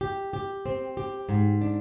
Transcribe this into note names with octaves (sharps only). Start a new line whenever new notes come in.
G4
G4
C4
G4
G#2
D4